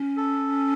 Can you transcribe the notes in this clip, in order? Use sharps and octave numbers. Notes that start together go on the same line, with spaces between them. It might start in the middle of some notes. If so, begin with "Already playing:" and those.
Already playing: C#4
A4